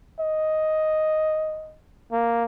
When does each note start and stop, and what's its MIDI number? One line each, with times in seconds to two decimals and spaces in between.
0.19 1.76 75
2.12 2.45 58